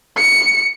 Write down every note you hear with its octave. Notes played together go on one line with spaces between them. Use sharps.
C#7